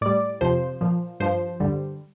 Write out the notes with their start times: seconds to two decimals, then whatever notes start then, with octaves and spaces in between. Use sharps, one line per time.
0.01 A2 G3 D5
0.41 F2 C3 F3 C5
0.81 A#2 F3
1.20 G2 F3 C5
1.60 G2 D3 G3